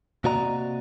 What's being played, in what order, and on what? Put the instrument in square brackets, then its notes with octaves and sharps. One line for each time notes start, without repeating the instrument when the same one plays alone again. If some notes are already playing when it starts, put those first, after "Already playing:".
[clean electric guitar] C3 A#3 F#4 D5 D#5 A#5